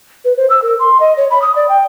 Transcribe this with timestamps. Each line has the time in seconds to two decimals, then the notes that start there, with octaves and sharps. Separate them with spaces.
0.25 B4
0.37 C5
0.50 E6
0.62 A#4
0.79 C6
1.00 D#5
1.17 C#5
1.31 B5
1.42 D#6
1.56 D5
1.69 G5